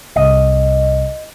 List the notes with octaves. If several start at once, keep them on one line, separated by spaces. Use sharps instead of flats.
C2 D#5